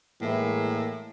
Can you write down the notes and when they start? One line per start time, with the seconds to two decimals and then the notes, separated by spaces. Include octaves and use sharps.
0.22 A2 E3 G#3 A#3